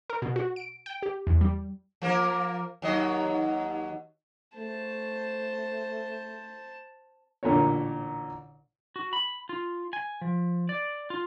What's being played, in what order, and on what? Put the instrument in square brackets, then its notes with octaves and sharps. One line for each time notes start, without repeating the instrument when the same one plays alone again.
[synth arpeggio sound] A#4
B2
F#4
D7
G5
G4
E2
G3
[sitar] F3 A#3 A#4
D#2 F#3 D#5
[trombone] A3 [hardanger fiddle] C5 A5
[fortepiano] A1 A#2 D3 A#4 C#5
[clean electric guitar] F#4
B5
F4
G#5
F3
D5
F4